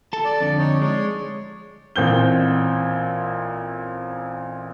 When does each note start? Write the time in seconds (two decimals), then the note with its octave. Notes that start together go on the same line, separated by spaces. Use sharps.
0.13 A4 A5
0.25 D5
0.40 F2 D3
0.58 D#4 C#5
0.82 G#3 C#5 D5
1.96 A1 A#2 C4 G6 G7